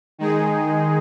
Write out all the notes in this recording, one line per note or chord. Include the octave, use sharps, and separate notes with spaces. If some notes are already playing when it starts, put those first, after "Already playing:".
D#3 G#3 D#4 G#4